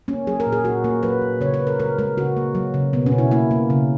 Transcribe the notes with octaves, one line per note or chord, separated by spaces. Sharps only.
A#3 C#4
F#3 G#4
A#4
A#2
G#4
A#2 F#4
A#3 A#4
F#3 B4
A#2
C#3 C#5
B4
C#3
A#4
G#3 A#4
G#3 A#4
C#3 F#4
A#3
F#3
C#3
B2 B3
C#4
B2
E4
A#3 E4
A#3
C#3